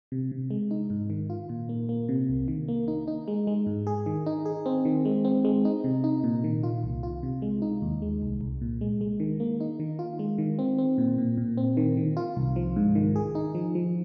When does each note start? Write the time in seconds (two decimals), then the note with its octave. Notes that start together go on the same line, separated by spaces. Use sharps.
0.12 C3
0.31 C3
0.51 G#3
0.71 D#4
0.90 G#2
1.10 D#3
1.30 F4
1.49 A#2
1.69 A#3
1.89 A#3
2.09 C3
2.29 C2
2.48 D#3
2.68 A#3
2.88 D#4
3.08 D#4
3.28 G#3
3.47 G#3
3.67 G#2
3.87 G#4
4.06 D#3
4.26 D#4
4.46 G#4
4.66 C4
4.85 D#3
5.05 G#3
5.25 C4
5.45 G#3
5.65 D#4
5.84 C3
6.04 D#4
6.24 A#2
6.44 D#3
6.63 F4
6.83 C2
7.03 F4
7.23 C3
7.42 G#3
7.62 D#4
7.82 D#2
8.02 G#3
8.22 C2
8.41 C2
8.61 A#2
8.81 G#3
9.01 G#3
9.20 D#3
9.40 A#3
9.60 D#4
9.80 D#3
9.99 F4
10.19 G#3
10.38 D#3
10.59 C4
10.78 C4
10.98 A#2
11.18 A#2
11.37 A#2
11.57 C4
11.77 D#3
11.97 D#3
12.17 F4
12.37 C2
12.56 F3
12.76 G#2
12.95 D#3
13.16 G#4
13.35 D#4
13.55 F3
13.75 F3